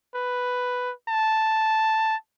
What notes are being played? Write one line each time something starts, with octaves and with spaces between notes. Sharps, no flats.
B4
A5